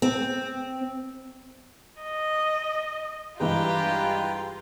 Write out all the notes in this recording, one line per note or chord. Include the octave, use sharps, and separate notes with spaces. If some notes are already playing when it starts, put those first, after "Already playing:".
C4
D#5
G2 E3 G#3 F4 G4 B4 G5 A#5